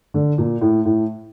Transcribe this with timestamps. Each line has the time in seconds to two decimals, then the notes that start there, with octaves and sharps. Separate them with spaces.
0.14 D3
0.38 A#2
0.61 A2
0.85 A2